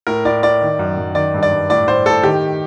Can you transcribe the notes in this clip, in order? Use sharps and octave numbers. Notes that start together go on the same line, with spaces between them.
A2 A#4
A2 D5
A2 D5
D#3
F#2
F#2
D#3 D5
G2
D5
G2
A2 D5
A2 C5
A2 A4
D#3 G4